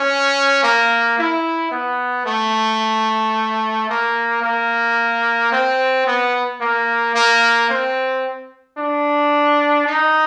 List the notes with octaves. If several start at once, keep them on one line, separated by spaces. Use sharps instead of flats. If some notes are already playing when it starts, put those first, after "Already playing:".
Already playing: C#4
A#3
E4
B3
A3
A#3
A#3
C4
B3
A#3
A#3
C4
D4
D#4